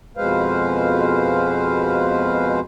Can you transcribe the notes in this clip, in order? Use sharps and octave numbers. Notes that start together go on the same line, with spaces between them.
F2 B2 G#3 B4 C5 F5